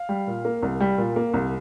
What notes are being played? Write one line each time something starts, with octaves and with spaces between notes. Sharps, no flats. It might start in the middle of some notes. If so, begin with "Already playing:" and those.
Already playing: F5
G3
A#2
A#3
C2
G3
A#2
A#3
C2